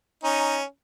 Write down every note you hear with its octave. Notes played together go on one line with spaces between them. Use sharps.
C#4 D#4